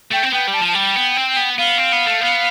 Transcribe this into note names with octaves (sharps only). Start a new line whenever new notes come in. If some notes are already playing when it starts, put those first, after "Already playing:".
A3 G5
C4
B3 G5
G3
A5
F3
A5
G3 G5
B3
C4
B3
B3 F5
C4
B3
A3
B3